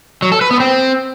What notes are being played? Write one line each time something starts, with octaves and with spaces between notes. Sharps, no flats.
F#3
A4
B4
B3
C4